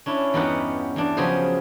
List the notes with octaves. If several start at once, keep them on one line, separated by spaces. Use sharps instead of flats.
C#4 D4 E4
E2 G2 B3 D#4 G4 F#5
E2 D4
C#3 F3 F#3 B3 G#4 C5